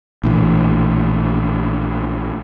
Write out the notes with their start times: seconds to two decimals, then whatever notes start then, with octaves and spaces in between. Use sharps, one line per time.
0.23 A#1 A2 E3